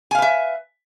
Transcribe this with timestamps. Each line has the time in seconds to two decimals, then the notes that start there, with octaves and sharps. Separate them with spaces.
0.11 G#5
0.15 F5
0.18 B4
0.22 E5